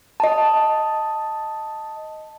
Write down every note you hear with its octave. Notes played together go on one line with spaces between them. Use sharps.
D#5 A5